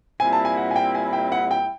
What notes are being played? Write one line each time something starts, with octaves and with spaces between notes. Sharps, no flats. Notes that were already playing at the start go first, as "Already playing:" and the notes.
A#2 G3 C4 E4 G#5
A5
G#5
F#5
G#5
G5
G#5
G5
F#5
G5